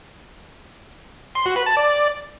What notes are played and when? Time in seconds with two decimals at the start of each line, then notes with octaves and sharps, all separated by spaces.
1.35 C6
1.46 F#4
1.56 B4
1.66 A5
1.77 D5